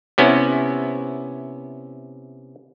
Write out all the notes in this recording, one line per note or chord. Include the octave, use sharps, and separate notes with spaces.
C3 B3 C#4 E4